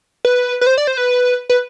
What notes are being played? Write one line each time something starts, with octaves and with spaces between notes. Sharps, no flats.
B4
B4
C5
D5
C5
B4
B4